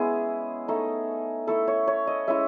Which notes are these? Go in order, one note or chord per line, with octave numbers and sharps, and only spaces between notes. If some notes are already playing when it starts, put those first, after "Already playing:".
Already playing: G#3 B3 C#4 E4 G#4
A3 D#4
A3 E4 A4
C#5
C#5
D#5
G#3 C#4 E4 E5